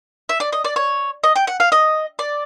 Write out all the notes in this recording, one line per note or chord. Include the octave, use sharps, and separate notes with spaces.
E5
D5
D#5
D5
C#5
D#5
G5
F#5
F5
D#5
D5